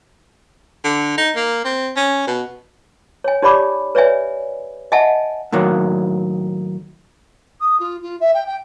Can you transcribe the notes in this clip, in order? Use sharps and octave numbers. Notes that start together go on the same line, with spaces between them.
D3
D#4
A#3
C4
C#4
B2
C#5 G#5
D#4 G4 C#5 D5 B5 D6
B4 C#5 D5 E5 G#5
D#5 E5 F#5 G#5 A5
A2 D#3 F#3 A#3
D#6
F4
F4
E5
G5
G5